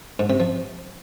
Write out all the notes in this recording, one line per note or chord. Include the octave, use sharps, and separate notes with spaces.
G#2
C3
F3